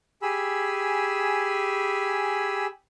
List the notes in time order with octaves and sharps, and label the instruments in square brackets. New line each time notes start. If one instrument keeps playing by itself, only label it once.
[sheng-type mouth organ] G4 G#4 G#5 B5 E6